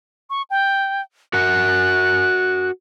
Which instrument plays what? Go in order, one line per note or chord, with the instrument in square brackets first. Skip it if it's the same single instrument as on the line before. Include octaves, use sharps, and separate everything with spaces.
[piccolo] C#6
G5
[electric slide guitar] F#4 A#4 F#5 [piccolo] F#6